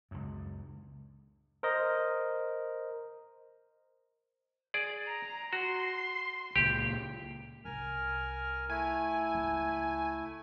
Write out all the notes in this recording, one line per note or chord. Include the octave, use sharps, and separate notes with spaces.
C#2 F#2
A#4 C5 D#5
G#4 D5
A#5
F#4 C6
C#2 A#2 G4
C2 A#4 G#5 F6
A3 E4 G#5
C#2 C#3